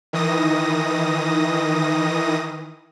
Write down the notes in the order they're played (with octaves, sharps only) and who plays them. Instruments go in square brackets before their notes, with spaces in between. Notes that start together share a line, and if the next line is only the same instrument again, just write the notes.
[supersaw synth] D#3 E3 D#6 A#6